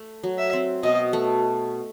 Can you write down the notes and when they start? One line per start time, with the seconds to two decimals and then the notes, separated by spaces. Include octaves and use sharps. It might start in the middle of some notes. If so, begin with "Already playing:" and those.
Already playing: A3
0.23 F#3
0.38 E5
0.53 C4
0.83 B2 D#5
1.13 A3